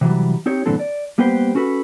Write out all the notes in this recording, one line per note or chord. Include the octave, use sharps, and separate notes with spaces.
C3 E3 F#3 G3
C4 D#4 G4 C#5
G2 A#2 D3 E3 C4 A4
D5
G3 A#3 B3 G4 B4 C5
C#4 F#4 A4 B4